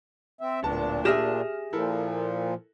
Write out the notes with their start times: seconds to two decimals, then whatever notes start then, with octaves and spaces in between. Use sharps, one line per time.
0.41 C4 E5
0.63 D1 A#2 B3 D4 A5
1.05 G4 G#4 E5 F6 A#6 E7
1.73 A#2 F3 E4 A4 A#4